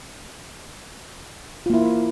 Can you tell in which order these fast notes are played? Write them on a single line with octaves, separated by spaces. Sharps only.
F4 A#3 E4